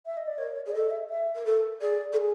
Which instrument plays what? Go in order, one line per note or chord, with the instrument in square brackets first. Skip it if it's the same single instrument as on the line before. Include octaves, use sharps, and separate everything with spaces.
[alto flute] E5
D#5
D5
[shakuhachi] A#4 [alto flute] C#5
[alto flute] C#5
[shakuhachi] G#4
[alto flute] D5
[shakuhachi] A4 [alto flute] D#5
[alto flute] D#5
E5
E5
[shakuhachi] A#4
A4
[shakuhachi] G#4 [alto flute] D5
[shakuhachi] A4
G#4